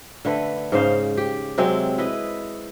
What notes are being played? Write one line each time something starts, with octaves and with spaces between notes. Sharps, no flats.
D3 A3 B4
G#2 C#3 C5 F5
G4
C3 F#3 G#3 C4
E4 B4 D#5